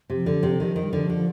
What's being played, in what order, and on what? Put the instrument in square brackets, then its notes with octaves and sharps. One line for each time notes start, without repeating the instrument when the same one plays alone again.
[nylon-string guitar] C3
[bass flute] F3
[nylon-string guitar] D3
[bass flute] F3
[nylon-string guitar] C3
[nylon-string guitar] D#3 [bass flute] F3
[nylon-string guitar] D#3
[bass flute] G3
[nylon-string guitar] D3 [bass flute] F3
[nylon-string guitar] D3